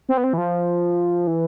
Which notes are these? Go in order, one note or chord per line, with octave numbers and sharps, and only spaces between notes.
C4
B3
C4
E3
F3
E3